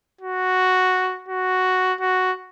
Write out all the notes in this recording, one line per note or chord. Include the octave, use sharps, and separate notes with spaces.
F#4
F#4
F#4